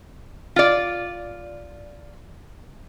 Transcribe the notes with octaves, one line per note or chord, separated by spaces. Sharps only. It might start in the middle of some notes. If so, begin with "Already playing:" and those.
F4 D5